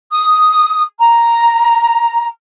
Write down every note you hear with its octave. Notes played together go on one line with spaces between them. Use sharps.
D#6
A#5